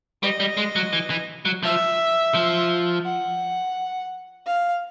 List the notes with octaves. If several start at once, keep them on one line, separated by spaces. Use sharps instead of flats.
G3 D#5
G3
G#3
F#3
E3
E3
F#3
F3 E5
F3
F#5
F5